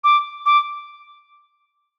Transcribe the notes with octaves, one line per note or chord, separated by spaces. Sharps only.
D6
D6